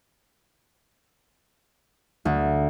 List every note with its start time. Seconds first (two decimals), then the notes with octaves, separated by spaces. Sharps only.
2.25 D2